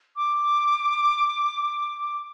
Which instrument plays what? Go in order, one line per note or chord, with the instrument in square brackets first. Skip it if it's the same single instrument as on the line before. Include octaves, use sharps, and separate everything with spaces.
[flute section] D6